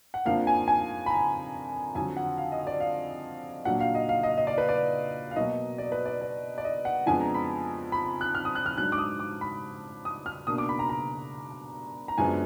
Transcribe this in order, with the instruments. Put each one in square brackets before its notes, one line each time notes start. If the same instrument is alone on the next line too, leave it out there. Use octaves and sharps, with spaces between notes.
[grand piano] F#5
F2 F3 A#3 D4 F5
G#5
G#5
B5
A#5
F2 D3 F#3 G#5
F#5
F5
D#5
D5
F5
A#2 F#3 D4 F#5
F5
D#5
F5
D#5
D#5
D5
B4
D5
F5
B2 F#3 A#3 D#5
D5
B4
D5
D5
D5
D#5
F#5
F2 F3 G#3 B3 D4 G#5
A#5
B5
B5
F#6
F6
D#6
F#6
F6
G#2 F#3 D4 F#6
D6
D#6
D6
B5
D#6
F6
B2 A#3 D4 D#6
D6
B5
A#5
A#5
A#5
F#2 F3 G#3 B3 D4 G#5